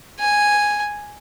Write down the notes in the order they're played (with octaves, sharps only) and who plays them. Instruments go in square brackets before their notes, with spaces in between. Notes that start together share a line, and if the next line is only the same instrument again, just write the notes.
[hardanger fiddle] G#5